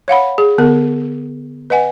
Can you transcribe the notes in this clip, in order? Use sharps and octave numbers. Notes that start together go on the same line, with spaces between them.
C#5 F5 F#5 B5
G#4
D3 B3 A#4
B4 D#5 F#5 G#5